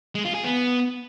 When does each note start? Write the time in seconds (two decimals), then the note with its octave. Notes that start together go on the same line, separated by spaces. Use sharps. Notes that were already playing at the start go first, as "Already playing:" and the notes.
0.15 G#3
0.25 F4
0.34 G#4
0.44 B3